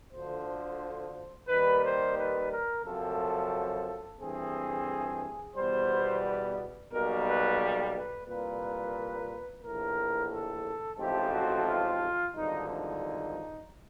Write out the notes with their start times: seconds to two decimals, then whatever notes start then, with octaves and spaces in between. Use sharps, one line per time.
0.12 D2 D3 F3 C5
1.48 D#2 D#3 G3 B4
1.82 C5
2.16 B4
2.50 A#4
2.83 F#2 C#3 F3 A3 C4 A4
4.19 G2 E3 A3 C4 G#4
5.55 E2 B2 G3 B3 C5
6.92 B1 B2 G3 A#3 A#4
7.25 B4
7.93 B4
8.27 C2 A#2 G3 A#3 B4
9.62 A#1 A2 E3 A#4
10.31 A4
10.99 A1 G#2 F3 A3 C4 G4
11.32 F#4
11.66 F4
12.34 G#1 G2 D3 F3 D#4
12.68 D#4